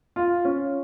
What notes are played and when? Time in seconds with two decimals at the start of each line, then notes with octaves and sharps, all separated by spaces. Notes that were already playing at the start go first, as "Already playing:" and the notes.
0.16 F4
0.45 C#4